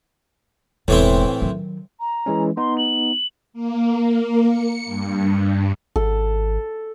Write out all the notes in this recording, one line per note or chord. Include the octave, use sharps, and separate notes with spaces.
E1 A2 E3 G#3 C4
D#3 F#3
A#5
E3 G#3 C#4
B3 D#4 C6
F#7
A#3
C#7
G2
G#1 A4